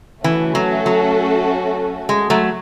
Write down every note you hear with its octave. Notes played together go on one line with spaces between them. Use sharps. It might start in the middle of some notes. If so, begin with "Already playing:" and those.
E3 A3 C#4 F#4 A4
F#3
F#3
G#3
F#3 A3